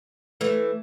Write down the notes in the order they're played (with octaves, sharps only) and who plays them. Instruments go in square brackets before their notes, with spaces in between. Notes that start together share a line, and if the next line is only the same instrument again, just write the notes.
[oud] E3 A3